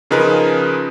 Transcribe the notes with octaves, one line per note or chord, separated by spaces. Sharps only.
C#3 F3 D#4 G#4 A#4 B4